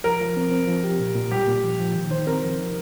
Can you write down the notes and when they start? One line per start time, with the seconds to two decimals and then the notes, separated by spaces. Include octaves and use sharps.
0.04 F3 A#4
0.21 F3
0.37 C4
0.52 C4
0.67 F3
0.84 G4
1.00 A#2
1.15 A#2
1.31 G3 G4
1.47 A#2
1.64 F3
1.80 F3
1.95 D#3
2.11 D#3 C5
2.26 C4 A#4
2.43 F3
2.58 D#4